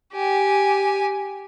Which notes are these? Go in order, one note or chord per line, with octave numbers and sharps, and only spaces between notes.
G4 G#5